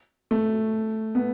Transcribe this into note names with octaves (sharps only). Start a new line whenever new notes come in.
A3
B3